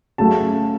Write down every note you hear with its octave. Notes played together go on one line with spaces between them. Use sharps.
C#3 F#3 A3 A5